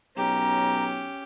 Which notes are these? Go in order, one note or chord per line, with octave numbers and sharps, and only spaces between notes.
B1 C#4 G4 A#5